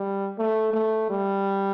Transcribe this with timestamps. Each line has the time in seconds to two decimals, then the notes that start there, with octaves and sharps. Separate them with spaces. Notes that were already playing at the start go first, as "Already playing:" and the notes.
Already playing: G3
0.38 A3
0.73 A3
1.10 G3